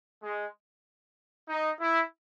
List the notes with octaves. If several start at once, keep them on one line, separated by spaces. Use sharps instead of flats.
G#3
D#4
E4